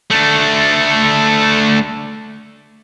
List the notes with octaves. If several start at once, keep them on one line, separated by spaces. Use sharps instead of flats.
A3 D4